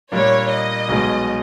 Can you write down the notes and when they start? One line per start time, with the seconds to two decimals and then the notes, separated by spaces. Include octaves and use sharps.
0.12 A#2 G3 A#3 D4 C#5
0.50 D#5
0.89 B1 B2 G#3